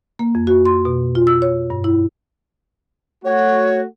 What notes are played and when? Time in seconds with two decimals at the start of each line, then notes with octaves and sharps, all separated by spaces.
0.19 A#3
0.35 F2
0.47 F#4
0.65 C6
0.85 B2
1.15 F4
1.27 E6
1.42 C#5
1.70 G2
1.84 E4
3.25 A3 F#4 C#5